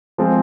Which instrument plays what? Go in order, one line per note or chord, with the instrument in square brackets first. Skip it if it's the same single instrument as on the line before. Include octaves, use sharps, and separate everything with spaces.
[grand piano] F3 G#3 C4